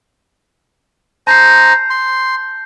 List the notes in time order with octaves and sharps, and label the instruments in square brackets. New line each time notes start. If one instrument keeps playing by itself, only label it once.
[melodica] C5 A#5 [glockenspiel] A5 G6 C7
[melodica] C6